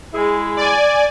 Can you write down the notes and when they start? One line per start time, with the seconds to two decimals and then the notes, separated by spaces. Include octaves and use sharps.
0.14 G#3 E4 G#4
0.57 D5 G#5